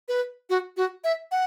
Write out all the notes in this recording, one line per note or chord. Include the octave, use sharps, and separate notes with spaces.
B4
F#4
F#4
E5
F#5